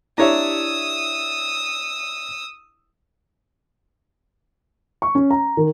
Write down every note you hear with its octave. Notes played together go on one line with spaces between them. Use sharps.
D4 E4 G4 C#5 E5 D#6 E6
C#6
C#4
A#5
D#3